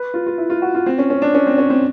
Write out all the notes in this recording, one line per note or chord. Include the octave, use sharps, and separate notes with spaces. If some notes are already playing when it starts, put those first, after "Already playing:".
Already playing: B4
F4
F4
E4
F4
F#4
F4
C4
C#4
C#4
D4
C#4
C4
C#4
C4